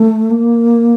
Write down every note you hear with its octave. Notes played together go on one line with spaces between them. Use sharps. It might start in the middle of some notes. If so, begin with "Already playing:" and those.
Already playing: A3
A#3